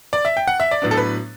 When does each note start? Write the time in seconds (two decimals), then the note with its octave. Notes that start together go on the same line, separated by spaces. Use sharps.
0.13 D5
0.25 E5
0.37 G5
0.47 F#5
0.60 E5
0.71 D5
0.82 A2 F#3 B3 D4
0.91 A4
0.97 B4